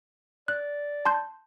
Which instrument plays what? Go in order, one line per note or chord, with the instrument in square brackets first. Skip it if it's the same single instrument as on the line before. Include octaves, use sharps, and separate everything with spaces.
[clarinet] D5 [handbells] F#6
[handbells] A5 C6 G6